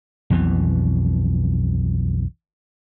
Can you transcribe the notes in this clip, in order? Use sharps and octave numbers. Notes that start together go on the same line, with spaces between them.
B1 F2 B2 E3